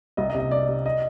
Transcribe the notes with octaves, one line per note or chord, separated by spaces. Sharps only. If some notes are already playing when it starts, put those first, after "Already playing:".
C2 D#5
D#5
C3
D#5
G3 D5
G3
D#5